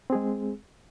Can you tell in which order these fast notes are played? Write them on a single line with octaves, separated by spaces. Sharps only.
C4 G#4 G#3